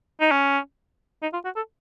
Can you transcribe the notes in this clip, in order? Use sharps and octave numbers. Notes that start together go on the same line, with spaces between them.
D#4
C#4
D#4
F4
F#4
A4